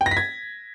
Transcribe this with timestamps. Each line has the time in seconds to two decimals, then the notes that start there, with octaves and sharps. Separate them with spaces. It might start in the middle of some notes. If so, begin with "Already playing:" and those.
0.01 G5
0.06 A#6
0.11 B6
0.17 G#6